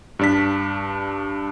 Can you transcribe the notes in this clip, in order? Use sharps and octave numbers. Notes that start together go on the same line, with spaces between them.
G2 D4 B6